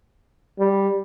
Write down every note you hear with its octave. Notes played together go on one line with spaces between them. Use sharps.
G3